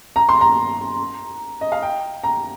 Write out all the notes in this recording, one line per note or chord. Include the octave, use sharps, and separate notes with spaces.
A#5
C6
A#5
D#5
F5
G5
A#5